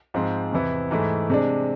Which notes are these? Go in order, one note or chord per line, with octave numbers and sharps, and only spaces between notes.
G#2 F3 G#3 C4
E2 C3 E3 B3 E4
G#2 E3 A3 E4
C3 G#3 D4